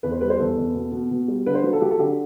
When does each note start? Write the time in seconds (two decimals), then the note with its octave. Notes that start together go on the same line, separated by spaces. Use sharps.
0.03 E2 B4
0.12 C5
0.21 G3 B4
0.30 C5
0.39 E2 A4
0.57 E2
0.75 B2
0.92 B2
1.11 B2
1.28 G3
1.46 D3 B4
1.55 C5
1.64 F#3 B4
1.73 A4
1.82 F#3 G4
1.91 A4
1.99 D3 G4